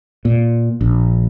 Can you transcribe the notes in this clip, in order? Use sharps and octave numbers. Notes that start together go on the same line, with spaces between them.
A#2
A#1